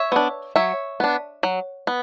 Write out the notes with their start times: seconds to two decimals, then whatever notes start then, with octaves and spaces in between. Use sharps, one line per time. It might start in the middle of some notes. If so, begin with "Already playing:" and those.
Already playing: C#5 E5
0.12 B3 D4
0.56 F#3 C#5 E5
1.00 B3 D4
1.43 F#3
1.87 B3